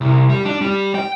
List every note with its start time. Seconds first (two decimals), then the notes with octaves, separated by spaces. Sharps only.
0.01 C2
0.29 G3
0.45 D4
0.61 G3
0.95 G5